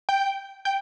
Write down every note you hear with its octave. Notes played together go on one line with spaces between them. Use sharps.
G5
G5